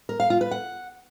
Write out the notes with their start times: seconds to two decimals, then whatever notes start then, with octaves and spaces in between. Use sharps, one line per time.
0.09 A#4
0.20 F5
0.30 F4
0.41 B4
0.51 F#5